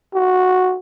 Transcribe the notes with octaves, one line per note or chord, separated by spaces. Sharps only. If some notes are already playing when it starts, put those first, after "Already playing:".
F#4